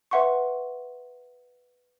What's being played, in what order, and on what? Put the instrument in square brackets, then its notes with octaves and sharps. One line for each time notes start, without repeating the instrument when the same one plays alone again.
[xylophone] B4 E5 F#5 C6 C#6